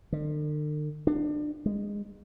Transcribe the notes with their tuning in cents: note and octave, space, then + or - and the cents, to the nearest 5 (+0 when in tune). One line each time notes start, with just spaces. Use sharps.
D3 +45
D4 +25
G#3 -25